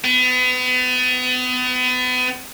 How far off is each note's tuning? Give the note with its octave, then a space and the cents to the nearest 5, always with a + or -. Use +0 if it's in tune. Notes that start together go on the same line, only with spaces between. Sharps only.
B3 +35